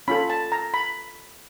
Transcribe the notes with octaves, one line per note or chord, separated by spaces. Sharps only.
C#4 F4 A4 B5
A5
A#5
B5